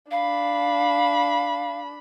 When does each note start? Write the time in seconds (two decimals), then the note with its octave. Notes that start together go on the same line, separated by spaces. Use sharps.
0.11 D4 F5 B5